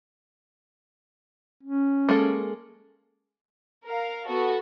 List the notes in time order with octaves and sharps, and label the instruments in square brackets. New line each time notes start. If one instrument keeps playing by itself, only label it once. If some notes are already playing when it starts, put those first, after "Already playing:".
[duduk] C#4
[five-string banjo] G#3 A#3 A4
[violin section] A#4 F5
B3 F#4 A4